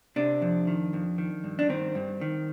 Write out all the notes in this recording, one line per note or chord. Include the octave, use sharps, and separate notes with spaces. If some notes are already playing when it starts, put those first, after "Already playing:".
C3 D4
F2
D#3
F2
D#3
G2
D4
D#3 C4
G2
D#3